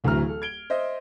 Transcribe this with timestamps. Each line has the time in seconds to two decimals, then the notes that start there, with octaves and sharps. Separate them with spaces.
0.04 D1 D2 E3 F#3 A#5 F6
0.28 A4
0.42 G#6 D7 G7
0.70 C5 D#5 E5